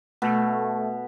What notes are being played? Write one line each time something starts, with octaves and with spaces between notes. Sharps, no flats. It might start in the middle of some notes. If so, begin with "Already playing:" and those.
B2 A3